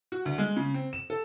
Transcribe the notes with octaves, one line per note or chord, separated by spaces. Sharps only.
F#4
D2
G#3
C#3
C4
E7
A4